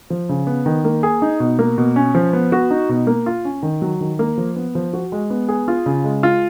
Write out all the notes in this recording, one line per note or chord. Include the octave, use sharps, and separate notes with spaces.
F3
C#3
B3
D#3
A#3
G#4
D#4
B2
A#3
B2
C#4
F3
B3
F#4
D#4
B2
A#3
F4
C#4
D#3
F#3
D#3
A#3
F3
B3
F3
F#4
G#3
B3
G#4
F4
C#3
G#3
F4